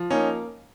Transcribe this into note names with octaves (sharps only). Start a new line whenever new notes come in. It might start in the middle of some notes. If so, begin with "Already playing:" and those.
Already playing: F3
A#3 C#4 D#4